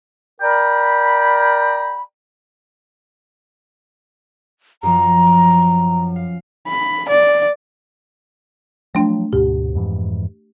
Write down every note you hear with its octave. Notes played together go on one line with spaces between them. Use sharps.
A#4 D5 G5 A#5 B5
F#2 F3 A#5
F5
B5
D5
F3 F#3 A3 D4 G5
D2 G#2 B2 G4
F2 G#2 E3